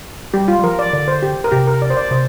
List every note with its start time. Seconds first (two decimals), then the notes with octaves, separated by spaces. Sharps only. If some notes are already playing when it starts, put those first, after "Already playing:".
0.34 G3 G4
0.48 F4
0.59 G3
0.64 F3 A#4
0.79 D5
0.93 D3 D5
1.08 C5
1.23 G4
1.44 A#4
1.52 C3 G4
1.67 A#4
1.82 D5
1.90 C5
1.97 D5
2.11 C3 C5